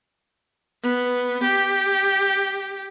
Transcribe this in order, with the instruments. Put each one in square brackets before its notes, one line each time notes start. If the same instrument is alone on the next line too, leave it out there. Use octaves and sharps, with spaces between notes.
[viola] B3
G4